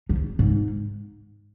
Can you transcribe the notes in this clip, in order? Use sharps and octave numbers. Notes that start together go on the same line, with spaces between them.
F3
G#2